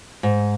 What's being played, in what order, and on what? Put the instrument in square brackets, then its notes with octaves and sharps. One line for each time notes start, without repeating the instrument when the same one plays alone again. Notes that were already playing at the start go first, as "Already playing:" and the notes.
[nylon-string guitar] G#2